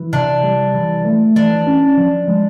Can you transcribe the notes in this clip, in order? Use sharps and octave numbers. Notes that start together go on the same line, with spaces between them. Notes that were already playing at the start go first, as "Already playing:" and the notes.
Already playing: E3
C3 D4
G3
E3
A3
E3 D4
C#4
F3
G#3